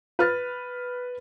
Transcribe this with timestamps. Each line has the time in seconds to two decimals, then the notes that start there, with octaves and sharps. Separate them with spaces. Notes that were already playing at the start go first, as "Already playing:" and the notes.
0.19 B4 F6 A6